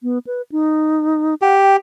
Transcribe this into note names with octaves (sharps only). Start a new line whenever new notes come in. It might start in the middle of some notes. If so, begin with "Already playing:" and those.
B3
B4
D#4
G4 F#5
G5